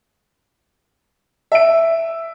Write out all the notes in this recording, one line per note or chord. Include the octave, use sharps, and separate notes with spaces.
E5 D7